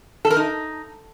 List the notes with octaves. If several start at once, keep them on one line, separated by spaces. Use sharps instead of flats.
A4
A#4
D#4